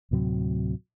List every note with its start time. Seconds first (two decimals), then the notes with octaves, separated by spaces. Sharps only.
0.11 D2 A2 C3 F#3